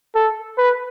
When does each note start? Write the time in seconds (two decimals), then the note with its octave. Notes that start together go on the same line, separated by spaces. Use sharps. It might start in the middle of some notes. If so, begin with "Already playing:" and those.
0.15 A4
0.58 B4